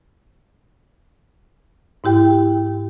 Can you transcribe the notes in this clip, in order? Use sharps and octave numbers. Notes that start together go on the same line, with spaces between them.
G#2 E4 G4 G5